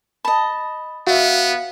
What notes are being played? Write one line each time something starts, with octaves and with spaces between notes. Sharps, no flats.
D#5 A5 B5
B3 F#4 E5 F5